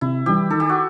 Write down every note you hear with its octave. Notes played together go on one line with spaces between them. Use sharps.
C3 E4
E3 G3 G4
D#3 A4
G4
F#4